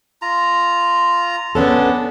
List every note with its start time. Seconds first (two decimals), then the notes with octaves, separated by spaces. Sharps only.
0.22 F4 A#5
1.55 B3 C#4 D4 A4